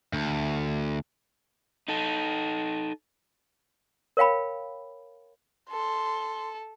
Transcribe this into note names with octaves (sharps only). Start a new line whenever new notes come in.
D2
D#4 A4
A#4 C#5 F5 G5 B5
A4 C6